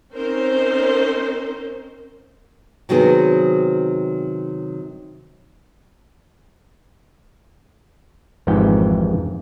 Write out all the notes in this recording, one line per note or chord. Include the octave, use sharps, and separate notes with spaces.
C4 C#4 D#4 A#4 C5
C3 D#3 F#3 B3 C4 G#4
G#1 F2 G#2 E3 G4 G5